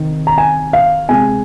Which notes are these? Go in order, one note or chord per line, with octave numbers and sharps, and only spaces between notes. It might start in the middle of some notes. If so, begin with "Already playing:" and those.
Already playing: C3 D#3 C4
A#5
G#5
F5
C3 G#3 C4 G#5